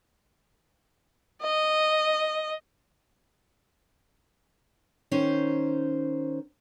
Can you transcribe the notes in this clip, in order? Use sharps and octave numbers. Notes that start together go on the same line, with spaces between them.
D#5
D#3 C#4 C5